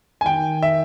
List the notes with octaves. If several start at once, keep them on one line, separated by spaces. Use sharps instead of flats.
G#5
D#3 G5
E5